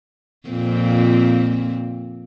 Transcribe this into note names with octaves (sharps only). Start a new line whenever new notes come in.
F2 A#2 C4